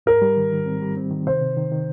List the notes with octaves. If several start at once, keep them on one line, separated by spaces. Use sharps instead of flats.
G#2 A#4
G3
D#3
D#3
C4
G3
C4
D#3
C3 C5
C3
D#3
D#3